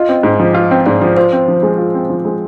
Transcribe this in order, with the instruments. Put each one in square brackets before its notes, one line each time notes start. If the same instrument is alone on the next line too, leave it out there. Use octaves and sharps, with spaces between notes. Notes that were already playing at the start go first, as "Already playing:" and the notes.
Already playing: [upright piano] F4 [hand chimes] D#5
[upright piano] C4
G#2
F3
F4
C4
[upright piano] G#2 [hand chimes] D5
[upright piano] F3 [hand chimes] C5
[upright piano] F4 [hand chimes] C5
[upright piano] C4
F3
G#3
F4
C4
F3
G#3